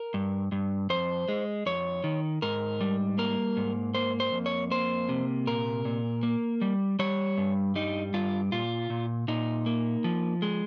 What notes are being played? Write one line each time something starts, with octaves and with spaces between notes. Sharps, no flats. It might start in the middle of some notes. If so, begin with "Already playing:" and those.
Already playing: A#4
G2
G2
F2 C5
G#3
F2 C#5
D#3
G#2 A#4
G3
A#3 A#4
G#2
A#3 C5
C5
F2
C#5
A#3 C5
C3
A#2 A#4
A#2
A#3
G3
G3 C#5
G2
G3 D#4
G2 F4
A#2 F4
A#2
A#2 D#4
A#3
F3
G#3